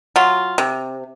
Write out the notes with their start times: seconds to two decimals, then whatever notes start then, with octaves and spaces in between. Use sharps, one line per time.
0.16 F#3 F4
0.58 C3